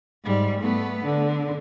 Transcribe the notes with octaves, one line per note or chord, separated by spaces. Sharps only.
G#2 G3
A3 B3
D3